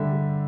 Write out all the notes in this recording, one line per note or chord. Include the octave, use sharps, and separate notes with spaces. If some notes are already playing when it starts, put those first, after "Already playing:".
Already playing: D3 G3 E5
G3